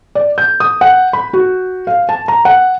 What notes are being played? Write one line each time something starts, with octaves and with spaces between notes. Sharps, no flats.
D5
G6
D#6
F#5
B5
F#4
F5
A5
A#5
F#5